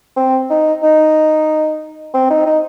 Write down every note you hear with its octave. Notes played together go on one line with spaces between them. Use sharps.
C4
D#4
D#4
C4
D#4
D#4